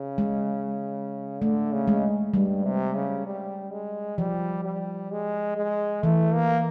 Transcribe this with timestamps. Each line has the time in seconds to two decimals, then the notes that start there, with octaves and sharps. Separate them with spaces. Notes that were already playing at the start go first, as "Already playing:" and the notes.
Already playing: C#3
0.18 G#3
1.42 D3 A3
1.73 C#3
1.88 G#3
2.34 G2 G3
2.64 C3
2.95 C#3
3.26 G3
3.72 G#3
4.18 F3 G3
4.65 G3
5.11 G#3
5.56 G#3
6.03 E3 A3
6.34 A#3